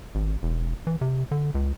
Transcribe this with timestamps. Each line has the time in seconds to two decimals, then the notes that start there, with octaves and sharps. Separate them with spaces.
0.15 G#1
0.43 E1
0.87 E3
1.01 C3
1.31 D3
1.55 C#2